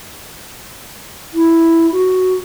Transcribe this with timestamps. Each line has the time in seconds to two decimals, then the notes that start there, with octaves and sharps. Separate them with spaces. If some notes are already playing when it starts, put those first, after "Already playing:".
1.34 E4
1.92 F#4